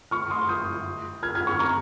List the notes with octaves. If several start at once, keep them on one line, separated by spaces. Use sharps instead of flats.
C#6 F6
C6 D#6
D#6 G6
F6 G#6
F6 G#6
C#6 F6
A#5 C#6